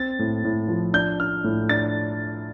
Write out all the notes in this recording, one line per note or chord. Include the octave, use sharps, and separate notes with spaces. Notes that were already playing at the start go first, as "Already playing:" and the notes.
Already playing: C4 A6
A2
A2
F3
D4 G6
D4 F6
A2
D4 A6